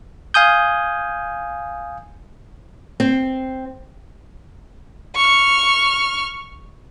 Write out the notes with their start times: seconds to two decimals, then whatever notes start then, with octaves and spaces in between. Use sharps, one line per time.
0.34 F5 G#5 D#6 G6
3.00 C4
5.15 C#6 F6